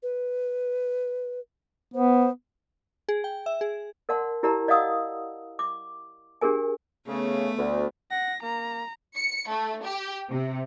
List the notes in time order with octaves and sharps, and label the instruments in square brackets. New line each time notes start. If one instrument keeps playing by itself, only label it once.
[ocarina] B4
[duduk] B3 [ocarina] C5
[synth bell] G#4
G5
E5
G#4
[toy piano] A#4 D5 F#5 A5 C6
E4 G4 A#4 D5 A5 A#5
D5 D#5 F5 F#5 D#6 E6
D6
D4 G4 G#4 A#4 G#5
[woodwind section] C#3 [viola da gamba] A3 B3
[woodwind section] D2
[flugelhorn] F#5 [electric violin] A#6
[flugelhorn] A#3 [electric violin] A#5
[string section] C#7
A3
G4
C3